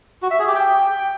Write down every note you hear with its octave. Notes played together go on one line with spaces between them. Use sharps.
F#4
E5
G#4
G4
G5